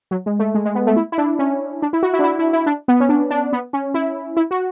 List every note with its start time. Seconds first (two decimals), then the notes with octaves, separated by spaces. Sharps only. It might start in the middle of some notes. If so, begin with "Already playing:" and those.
0.11 F#3
0.26 G#3
0.39 A3
0.55 G#3
0.65 G#3
0.75 B3
0.87 A3
0.96 E4
1.12 E4
1.18 D4
1.39 C#4
1.82 D4
1.93 E4
2.03 F#4
2.14 E4
2.19 D4
2.24 E4
2.39 E4
2.53 E4
2.66 D4
2.88 B3
3.00 C#4
3.09 D4
3.31 D4
3.53 B3
3.73 C#4
3.94 E4
4.37 E4
4.51 F#4